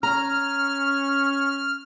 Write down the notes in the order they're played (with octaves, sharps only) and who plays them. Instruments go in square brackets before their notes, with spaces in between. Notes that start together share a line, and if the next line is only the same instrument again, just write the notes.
[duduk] C#4 [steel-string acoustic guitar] A#5 [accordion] F6